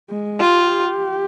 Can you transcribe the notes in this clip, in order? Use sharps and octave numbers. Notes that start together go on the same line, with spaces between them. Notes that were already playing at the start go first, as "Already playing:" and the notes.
G#3
F4 G4